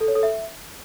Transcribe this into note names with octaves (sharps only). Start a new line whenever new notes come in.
A4
C#5
A4
E5